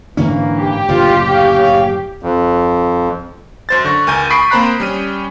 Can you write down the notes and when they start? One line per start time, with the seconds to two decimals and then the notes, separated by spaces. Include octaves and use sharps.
0.17 G#2 D3 E3 A#3 C#4
0.59 G4
0.88 F#1 A2 D3 F4
1.30 C#3 C#5 F5
2.23 F2
3.69 F#2 C5 A6
3.84 D3 C#6 A#6
4.07 C#2 A#4 G#5 G6 D#7
4.30 B5 C#6 D#6 B6 C7 D7
4.51 A#3 C4 C5 A#5 B5 F#6
4.80 G3 C#4 D#7